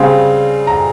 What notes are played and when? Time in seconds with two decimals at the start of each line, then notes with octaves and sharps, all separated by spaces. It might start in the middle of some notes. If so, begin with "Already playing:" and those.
Already playing: C#3 G3 C4 F5
0.67 A#5